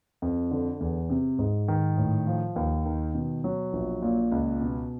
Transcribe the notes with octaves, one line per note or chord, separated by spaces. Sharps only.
F2
D3
E2
C3
G#2
D#3
A2
F3
D#2
D#3
B2
F#3
A#1
A#2
C#2
B2